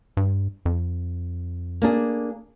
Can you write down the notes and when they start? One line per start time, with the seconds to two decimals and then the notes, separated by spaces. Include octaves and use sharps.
0.17 G2
0.65 F2
1.82 A#3 D4 G#4